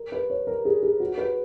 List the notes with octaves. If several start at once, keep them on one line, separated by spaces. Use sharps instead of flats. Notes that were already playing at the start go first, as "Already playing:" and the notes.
Already playing: A#4
B4
C#5
A#4
G#4
G#4
F#4
B4